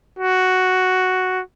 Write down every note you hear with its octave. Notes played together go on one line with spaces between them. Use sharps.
F#4